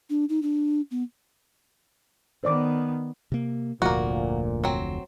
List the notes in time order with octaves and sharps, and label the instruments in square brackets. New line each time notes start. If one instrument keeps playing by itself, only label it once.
[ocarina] D4
D#4
D4
B3
[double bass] D#3 B3 [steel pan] C5 D5 D6
[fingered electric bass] C3 A#3
[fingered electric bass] F1 D2 F3 [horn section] A#2 [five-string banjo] A#3 F#4
[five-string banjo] F#3 C4